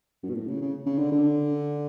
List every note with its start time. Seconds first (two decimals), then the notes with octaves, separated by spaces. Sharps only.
0.23 F#2
0.30 B2
0.35 A2
0.48 C#3
0.61 C#3
0.86 C#3
0.98 D3
1.12 D3